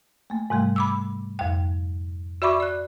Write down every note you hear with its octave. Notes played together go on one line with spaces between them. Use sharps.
A3 A#3
G#2 C3 G3 A3
B5 D6 E6
F2 G5
F#4 D5 E5 B5 C#6 D6
D5 F#6